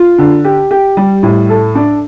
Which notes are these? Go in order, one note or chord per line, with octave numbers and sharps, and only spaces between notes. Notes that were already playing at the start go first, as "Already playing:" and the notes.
Already playing: F4
D3
G4
G4
G3
A2
A4
D4